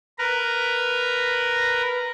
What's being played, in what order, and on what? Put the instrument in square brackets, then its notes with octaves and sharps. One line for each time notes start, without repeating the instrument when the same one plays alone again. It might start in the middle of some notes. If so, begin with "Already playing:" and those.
[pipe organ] A#4 B4 A#5